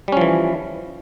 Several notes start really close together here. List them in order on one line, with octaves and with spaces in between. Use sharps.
G3 C#4 F3 E3